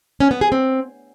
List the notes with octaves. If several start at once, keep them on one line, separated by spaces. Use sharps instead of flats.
C#4
B3
G#4
C4